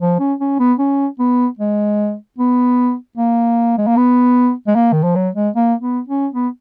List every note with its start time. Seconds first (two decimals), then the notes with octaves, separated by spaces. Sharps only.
0.01 F3
0.20 C#4
0.41 C#4
0.59 B3
0.79 C#4
1.19 B3
1.59 G#3
2.39 B3
3.17 A#3
3.78 G#3
3.87 A#3
3.97 B3
4.67 G#3
4.75 A#3
4.92 D#3
5.03 F3
5.16 F#3
5.35 G#3
5.56 A#3
5.81 B3
6.09 C#4
6.34 B3